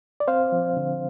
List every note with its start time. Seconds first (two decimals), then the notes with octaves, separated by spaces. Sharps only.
0.20 D5
0.28 C4 C5 F5
0.52 F3
0.77 D3